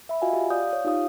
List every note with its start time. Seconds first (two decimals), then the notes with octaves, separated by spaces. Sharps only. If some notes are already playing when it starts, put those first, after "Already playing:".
0.09 E5 B5
0.22 F4 F#4 D#5 F5 F#5 G#5
0.33 G4
0.50 D5 F5 D#6 G6
0.73 C#5
0.85 D#4 F4 G4 F5 D#6